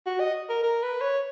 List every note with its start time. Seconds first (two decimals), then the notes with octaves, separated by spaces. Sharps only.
0.06 F#4
0.20 D#5
0.49 A#4
0.63 A#4
0.83 B4
1.01 C#5